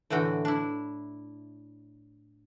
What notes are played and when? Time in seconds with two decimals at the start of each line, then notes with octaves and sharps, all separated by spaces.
0.10 A2 D3 E3 F#4 G5
0.45 D4 E4